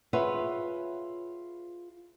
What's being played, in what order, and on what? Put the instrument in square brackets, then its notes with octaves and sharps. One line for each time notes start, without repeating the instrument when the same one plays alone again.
[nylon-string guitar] F4 G#4 B4 C#5 E5 F#5